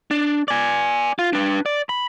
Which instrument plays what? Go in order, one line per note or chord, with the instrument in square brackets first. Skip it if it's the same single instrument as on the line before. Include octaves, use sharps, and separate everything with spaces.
[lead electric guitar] D4
D5 G#5
F4
D4 B4
D5
B5